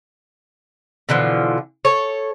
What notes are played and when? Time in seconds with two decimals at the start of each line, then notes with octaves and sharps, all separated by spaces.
1.09 B2 D3 E3 F3
1.85 A4 C#5